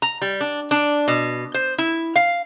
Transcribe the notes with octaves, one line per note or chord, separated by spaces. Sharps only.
A#5
G3
D4
D4
B2
C5
E4
F5